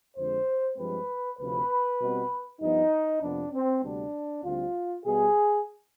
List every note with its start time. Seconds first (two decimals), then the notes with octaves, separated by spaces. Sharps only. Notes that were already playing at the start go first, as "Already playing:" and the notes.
0.17 F2 D3 G#3 C5
0.78 G2 F3 G#3 C4 B4
1.39 D2 C3 F3 C4 B4
2.00 B2 G3 C4
2.61 G2 F3 B3 D#4
3.22 F2 C3 F3 B3 D4
3.53 C4
3.83 D2 C3 G3 B3 D4
4.44 D2 D3 G3 C4 F4
5.05 B2 G3 B3 G#4